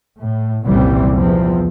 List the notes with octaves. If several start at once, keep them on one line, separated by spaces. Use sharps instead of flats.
A2
F#1 C2 A#2 E3 G3 C4
E2 F3 C4